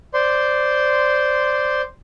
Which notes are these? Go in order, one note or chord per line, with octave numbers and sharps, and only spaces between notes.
C5 D5 C6